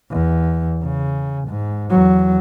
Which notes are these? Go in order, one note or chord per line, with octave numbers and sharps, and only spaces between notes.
E2
C#3
G#2
E2 F#3